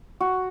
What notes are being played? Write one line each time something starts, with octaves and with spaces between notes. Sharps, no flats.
F#4